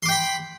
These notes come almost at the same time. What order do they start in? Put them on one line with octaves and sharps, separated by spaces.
C6 D6 G5 B5